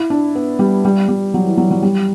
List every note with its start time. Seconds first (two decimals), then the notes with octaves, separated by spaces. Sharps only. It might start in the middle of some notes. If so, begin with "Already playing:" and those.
Already playing: E4
0.10 D4
0.35 B3
0.59 G3
0.85 G3
1.08 G3
1.34 F#3
1.46 E3
1.57 F#3
1.71 F#3
1.82 G3